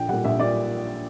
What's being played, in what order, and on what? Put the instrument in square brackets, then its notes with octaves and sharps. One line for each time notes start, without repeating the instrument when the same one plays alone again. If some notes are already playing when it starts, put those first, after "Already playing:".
Already playing: [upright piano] A#1 G5
A#2 G3 F#5
A#1 E5
A#2 G3 D5